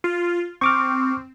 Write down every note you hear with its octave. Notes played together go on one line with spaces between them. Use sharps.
F4
C4 C#6 D6 F6